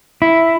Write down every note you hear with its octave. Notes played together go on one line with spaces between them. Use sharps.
E4